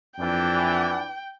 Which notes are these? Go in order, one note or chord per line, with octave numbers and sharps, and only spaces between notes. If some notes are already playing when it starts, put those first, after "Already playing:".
F2 E3 D4 G5